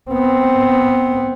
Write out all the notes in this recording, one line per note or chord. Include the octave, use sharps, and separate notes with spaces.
B3 C4